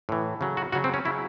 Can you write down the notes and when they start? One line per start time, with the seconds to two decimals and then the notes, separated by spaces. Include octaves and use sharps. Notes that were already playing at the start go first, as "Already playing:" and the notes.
0.09 A2 E3
0.41 C#3 F#3
0.57 F#4
0.72 C#3 F#3 F#4
0.84 C4
0.94 C#4
1.05 C#3 F#3 E4